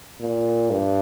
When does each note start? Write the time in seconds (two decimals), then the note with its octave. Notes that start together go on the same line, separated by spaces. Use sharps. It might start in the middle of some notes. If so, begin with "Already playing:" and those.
0.21 A#2
0.71 G2